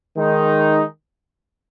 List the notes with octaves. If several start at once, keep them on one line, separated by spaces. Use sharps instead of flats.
D#3 G#3 D#4